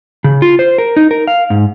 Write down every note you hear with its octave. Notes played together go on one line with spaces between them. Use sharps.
C#3
F4
C5
A#4
D#4
A#4
F5
G#2